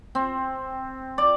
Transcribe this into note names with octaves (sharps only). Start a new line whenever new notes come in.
C4
D5